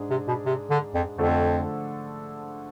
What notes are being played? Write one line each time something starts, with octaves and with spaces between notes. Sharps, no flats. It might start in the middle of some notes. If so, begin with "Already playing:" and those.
Already playing: G#2 G#3 D4 G#4
C3
B2
C3
D3
F2
F2 D3 F3 A3 D4 A4